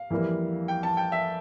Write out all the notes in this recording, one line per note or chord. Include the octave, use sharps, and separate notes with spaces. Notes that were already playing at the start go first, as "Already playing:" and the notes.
Already playing: F5
F2 E3 G3 A#3
G5
A5
G5
E5